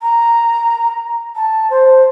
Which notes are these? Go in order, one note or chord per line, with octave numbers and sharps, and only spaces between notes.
A#5
A5
C5